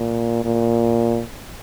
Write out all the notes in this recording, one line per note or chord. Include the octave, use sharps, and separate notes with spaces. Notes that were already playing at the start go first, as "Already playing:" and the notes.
Already playing: A#2
A#2